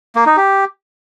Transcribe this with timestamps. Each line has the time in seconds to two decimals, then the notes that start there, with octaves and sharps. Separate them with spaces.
0.16 A#3
0.26 D#4
0.37 G4